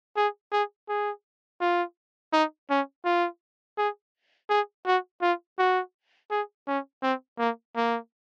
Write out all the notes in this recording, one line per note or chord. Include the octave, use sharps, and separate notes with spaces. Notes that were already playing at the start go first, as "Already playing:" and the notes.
G#4
G#4
G#4
F4
D#4
C#4
F4
G#4
G#4
F#4
F4
F#4
G#4
C#4
C4
A#3
A#3